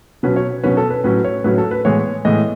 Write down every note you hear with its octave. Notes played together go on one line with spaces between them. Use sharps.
B2 F#3 C#4 B4
C#5
B2 F#3 C#4 B4
A4
B4
A2 F#3 C#4 B4
C#5
A2 F#3 C#4 B4
A4
B4
A2 E3 G#3 B3 C#5
A2 E3 G#3 B3 D#5